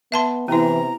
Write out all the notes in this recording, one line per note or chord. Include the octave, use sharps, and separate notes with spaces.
B3 E5 A5 C6
C3 E3 B3 E4 A#5